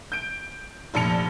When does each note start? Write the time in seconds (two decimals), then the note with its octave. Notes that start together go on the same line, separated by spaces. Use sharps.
0.12 G6 D7
0.94 F1 A#1 A5 C#7 F7